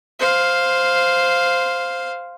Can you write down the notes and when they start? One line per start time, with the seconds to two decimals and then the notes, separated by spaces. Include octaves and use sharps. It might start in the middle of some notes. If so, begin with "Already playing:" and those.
0.19 C5 F5